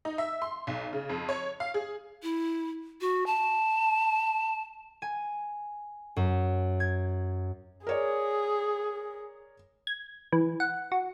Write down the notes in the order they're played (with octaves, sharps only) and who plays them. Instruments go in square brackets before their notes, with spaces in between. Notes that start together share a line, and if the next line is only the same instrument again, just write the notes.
[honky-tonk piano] D#4
E5
C6
B1
C#3
F2
C#5
F5
G#4
[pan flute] E4
F#4
A5
[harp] G#5
F#2
G#6
[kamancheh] G#4 [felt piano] A#4 C#5 D5
[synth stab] G#6
E3
F#5
F#4